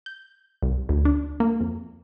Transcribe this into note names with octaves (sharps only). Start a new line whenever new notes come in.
G6
C2
D2
D4
A#3
F2